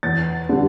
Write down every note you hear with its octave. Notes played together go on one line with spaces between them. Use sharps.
E2 A6
D3 G3